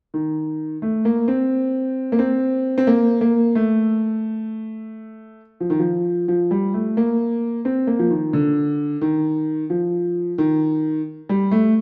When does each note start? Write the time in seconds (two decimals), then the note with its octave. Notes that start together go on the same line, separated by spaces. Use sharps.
0.14 D#3
0.82 A3
1.05 A#3
1.28 C4
2.12 A#3
2.19 C4
2.78 C4
2.87 A#3
3.21 A#3
3.55 A3
5.60 F3
5.70 D#3
5.79 F3
6.28 F3
6.51 G3
6.74 A3
6.97 A#3
7.65 C4
7.87 A#3
7.99 F3
8.11 D#3
8.33 D3
9.01 D#3
9.70 F3
10.38 D#3
11.29 G3
11.51 A3